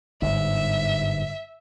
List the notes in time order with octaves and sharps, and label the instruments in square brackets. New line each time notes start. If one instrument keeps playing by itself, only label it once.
[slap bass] G1 G#2 [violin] E5